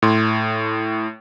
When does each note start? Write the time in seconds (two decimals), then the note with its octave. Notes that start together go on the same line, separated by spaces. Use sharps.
0.02 A2 C6